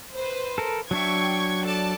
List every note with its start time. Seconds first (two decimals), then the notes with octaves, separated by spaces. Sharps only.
0.14 B4 C5
0.58 A4 A#4
0.91 F#3 D4 E5 G5 C#6 G#6
1.64 A4 D5 A5